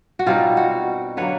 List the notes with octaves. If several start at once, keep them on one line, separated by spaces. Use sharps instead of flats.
F#4
B2 G3 C4 D#4 F4
F#4
D3 F#3 A#3 B4 C#5